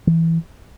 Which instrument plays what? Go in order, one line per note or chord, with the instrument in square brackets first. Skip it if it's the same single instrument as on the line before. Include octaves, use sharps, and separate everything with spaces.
[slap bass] E3